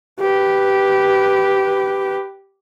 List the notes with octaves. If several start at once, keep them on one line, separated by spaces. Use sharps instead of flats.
G4 B4